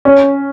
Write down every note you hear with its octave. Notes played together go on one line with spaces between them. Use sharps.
C#4